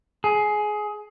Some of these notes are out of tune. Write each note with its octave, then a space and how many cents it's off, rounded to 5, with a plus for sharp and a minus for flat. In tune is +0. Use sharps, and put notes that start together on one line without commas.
G#4 +15